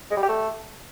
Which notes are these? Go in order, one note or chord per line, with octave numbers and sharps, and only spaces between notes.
G#3
G3
G4
A3